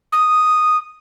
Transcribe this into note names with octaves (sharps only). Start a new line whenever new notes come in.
D#6